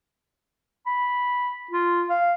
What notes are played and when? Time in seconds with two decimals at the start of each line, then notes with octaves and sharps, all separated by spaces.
0.86 B5
1.71 F4
2.10 F5